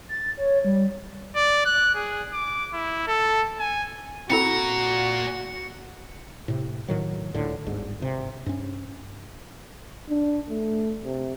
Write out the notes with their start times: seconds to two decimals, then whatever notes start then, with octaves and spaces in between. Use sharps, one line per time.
0.09 A6
0.38 C#5
0.64 G3
1.35 D5
1.65 F#6
1.95 G#4
2.33 D6
2.73 E4
3.08 A4
3.60 G#5
4.30 A#2 C4 E4 F#4 A4 A#5 C#7
6.48 A2 C3
6.88 A2 D#3 F#3
7.34 C#2 A2 D3
7.66 G1 D2 G#2
8.00 G#1 C3
8.46 G2 C#4
10.09 D4
10.50 A3
11.04 C3